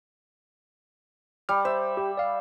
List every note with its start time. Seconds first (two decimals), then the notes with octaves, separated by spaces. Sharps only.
1.49 G3 F6
1.65 C5 E5
1.97 G4
2.17 D5 F5